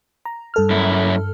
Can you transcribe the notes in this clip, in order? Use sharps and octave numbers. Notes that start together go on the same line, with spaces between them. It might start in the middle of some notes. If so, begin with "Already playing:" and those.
A#5
G2 A4 F6
F#2 E4